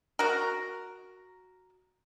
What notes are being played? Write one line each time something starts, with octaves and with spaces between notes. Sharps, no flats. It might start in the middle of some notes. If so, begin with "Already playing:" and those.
F#4 A#4